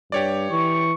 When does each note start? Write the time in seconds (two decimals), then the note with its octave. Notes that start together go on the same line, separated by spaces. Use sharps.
0.12 G2 G4 C#5 D5
0.50 E3 C#6